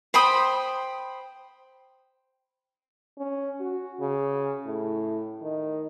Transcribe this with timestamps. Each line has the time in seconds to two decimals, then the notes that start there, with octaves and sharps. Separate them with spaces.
0.14 C5 G5 B5 D#6
3.18 C#4
3.60 F#4
4.00 C#3
4.65 A2
5.42 D#3